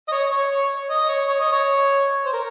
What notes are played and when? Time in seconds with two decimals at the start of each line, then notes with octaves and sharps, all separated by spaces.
0.08 D#5
0.12 C#5
0.32 C#5
0.51 C#5
0.90 D#5
1.09 C#5
1.29 C#5
1.40 D#5
1.52 C#5
2.25 C5
2.33 A#4